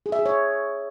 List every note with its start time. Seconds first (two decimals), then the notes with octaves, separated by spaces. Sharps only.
0.06 G#4
0.12 E5
0.19 G#4
0.26 C#5